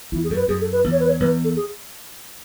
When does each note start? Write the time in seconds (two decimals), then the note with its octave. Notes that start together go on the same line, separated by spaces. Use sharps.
0.12 E2 E4
0.24 G#4
0.30 F#2 A4
0.36 B4
0.48 F#2 G#4
0.61 A4
0.72 B4
0.84 E2
0.92 C#5
1.00 B4
1.07 C#5
1.20 E2 B4
1.44 A4
1.56 G#4